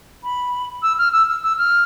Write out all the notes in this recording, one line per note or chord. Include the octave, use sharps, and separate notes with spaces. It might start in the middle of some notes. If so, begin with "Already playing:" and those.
B5
E6
F6
E6
E6
E6
F6